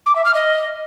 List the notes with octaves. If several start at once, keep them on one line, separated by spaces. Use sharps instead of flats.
D6
E5
F6
D#5